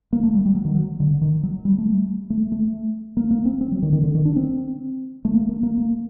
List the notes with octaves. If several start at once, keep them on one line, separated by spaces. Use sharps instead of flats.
A#3
A3
G3
G3
F#3
D#3
F#3
D3
D3
D#3
F#3
G3
A3
G3
A3
A3
A#3
A#3
C4
C4
F#3
D#3
D#3
D3
D#3
D4
C4
A3
A#3
A#3
A#3
A#3